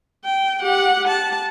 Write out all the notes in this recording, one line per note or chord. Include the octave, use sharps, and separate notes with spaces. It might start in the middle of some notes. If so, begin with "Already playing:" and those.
G5
G4 F#5
A5